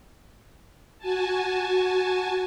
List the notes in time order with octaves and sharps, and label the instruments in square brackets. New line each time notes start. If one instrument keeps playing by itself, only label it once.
[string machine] F#4 G#5 A5